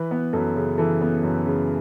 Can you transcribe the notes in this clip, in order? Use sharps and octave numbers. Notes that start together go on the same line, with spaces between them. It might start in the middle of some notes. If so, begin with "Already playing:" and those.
Already playing: E3 B4
B3
F#2 A4
C#3
E3 A4
B3
F#2
C#3